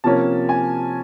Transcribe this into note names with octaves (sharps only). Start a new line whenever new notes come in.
C3 F3 A#3 C#4 A5
G#5